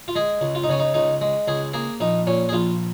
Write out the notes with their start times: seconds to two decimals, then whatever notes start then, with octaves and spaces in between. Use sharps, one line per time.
0.08 F4
0.15 G#3 G#4
0.41 C#2
0.55 F4
0.64 D#4
0.69 C#3 C#4
0.80 D#4
0.94 C#2 D#4
1.21 G#3
1.48 C#2 G#4
1.74 A#3 G#4
2.00 A#1 D#4
2.27 A#2 C#4
2.49 G#4
2.53 A#1 F4